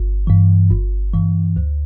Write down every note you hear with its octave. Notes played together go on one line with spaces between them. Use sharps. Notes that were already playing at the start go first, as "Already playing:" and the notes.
Already playing: G1
G2 E3
G1
G2 E3
D2